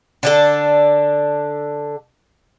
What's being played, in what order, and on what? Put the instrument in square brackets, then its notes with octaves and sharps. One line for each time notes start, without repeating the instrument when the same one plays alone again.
[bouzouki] D3 D4 A4